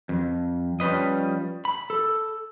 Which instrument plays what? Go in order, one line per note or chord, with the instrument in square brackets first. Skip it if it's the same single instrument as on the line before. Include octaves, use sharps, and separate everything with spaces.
[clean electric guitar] F2
F3 G3 C#4 B4 D#5
B5
A4